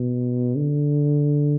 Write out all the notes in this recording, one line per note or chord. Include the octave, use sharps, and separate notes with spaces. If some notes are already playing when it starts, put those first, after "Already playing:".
Already playing: B2
D3